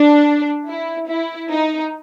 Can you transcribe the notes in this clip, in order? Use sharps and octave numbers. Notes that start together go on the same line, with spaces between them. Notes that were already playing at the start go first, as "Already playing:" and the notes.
Already playing: D4
E4
E4
D#4